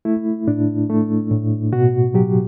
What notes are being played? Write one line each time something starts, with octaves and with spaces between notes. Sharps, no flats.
A3 E4
A2 D4
A3
A2
B2 F#4
F#3 G4